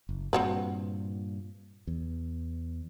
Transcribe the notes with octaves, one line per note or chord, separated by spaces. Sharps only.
F#1
G2 A#2 C4 F#4 B4
E2